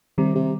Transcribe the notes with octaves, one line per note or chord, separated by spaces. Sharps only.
C3 D#3 G3
C3